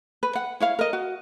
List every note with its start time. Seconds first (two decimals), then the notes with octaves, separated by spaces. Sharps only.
0.23 B4
0.35 F#5
0.60 E4 C#5 F5
0.79 A#4 D#5
0.93 F#4